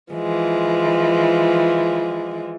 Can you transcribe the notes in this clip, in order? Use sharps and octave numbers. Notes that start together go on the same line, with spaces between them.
E3 F3 G#3